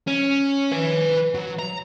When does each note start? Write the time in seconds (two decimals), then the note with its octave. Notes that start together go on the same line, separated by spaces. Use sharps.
0.07 C#4
0.72 B4 G#5
1.35 F#3
1.59 A#5